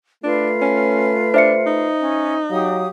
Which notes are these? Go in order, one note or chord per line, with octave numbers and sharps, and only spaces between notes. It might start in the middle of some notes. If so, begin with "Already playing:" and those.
A3 D4 F4 B4
C#4
D4 C5 E5 C#7
D#4
C#4
F#3 G4 F5 D#6